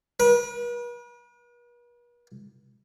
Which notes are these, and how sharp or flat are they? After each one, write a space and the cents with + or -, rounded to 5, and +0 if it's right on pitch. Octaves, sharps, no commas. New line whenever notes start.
B4 -45